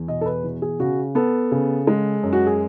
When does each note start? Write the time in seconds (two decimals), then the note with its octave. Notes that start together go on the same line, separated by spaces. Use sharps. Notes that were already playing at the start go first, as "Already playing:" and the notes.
Already playing: E2
0.08 B2 D#5
0.21 A4
0.26 B4
0.44 E3
0.62 G#4
0.80 C#3 F#4
1.15 B3 A4
1.52 C#3
1.87 G#3
2.23 F#2
2.33 F#4
2.47 G#4